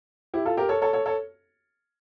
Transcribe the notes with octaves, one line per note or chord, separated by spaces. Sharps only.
E4 G4
F4 A4
G4 A#4
A4 C#5
A4 C#5
A4 C#5
A4 C#5